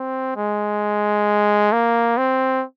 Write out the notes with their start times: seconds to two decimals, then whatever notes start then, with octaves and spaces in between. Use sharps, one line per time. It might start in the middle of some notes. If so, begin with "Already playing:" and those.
Already playing: C4
0.37 G#3
1.72 A#3
2.17 C4